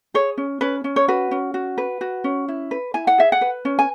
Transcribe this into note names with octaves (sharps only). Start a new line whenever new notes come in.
G#4 C#5
C#4
C#4 B4
C#4
C#5
F#4 B4
C#4
F#4
B4
F#4
C#4
E4
B4
E4 G#5
F#5
G#4 E5
F#5
B4
C#4
G#5